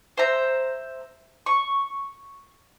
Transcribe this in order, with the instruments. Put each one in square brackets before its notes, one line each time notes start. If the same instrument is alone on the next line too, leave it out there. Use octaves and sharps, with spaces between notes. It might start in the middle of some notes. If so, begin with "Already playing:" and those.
[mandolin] C5 E5 A#5
C#6